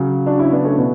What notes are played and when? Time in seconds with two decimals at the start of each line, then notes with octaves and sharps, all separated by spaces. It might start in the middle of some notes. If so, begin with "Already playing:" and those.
Already playing: C#3 F#3
0.26 D4 F#4
0.39 C#4 E4
0.52 B3 D4
0.64 A3 C#4
0.77 B2 B3